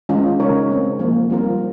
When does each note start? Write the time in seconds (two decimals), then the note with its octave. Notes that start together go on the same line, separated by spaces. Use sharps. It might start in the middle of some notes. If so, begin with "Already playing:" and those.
0.09 D#3 G#3 C#4 F4
0.40 C#3 G#3 D#4 A#4 C#5
0.70 G#3 C4 D#4
0.99 F3 A#3 F4
1.30 D#3 G3 C4 F4 A#4